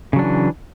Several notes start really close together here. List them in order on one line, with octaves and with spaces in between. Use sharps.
C#3 F#3 D4 E3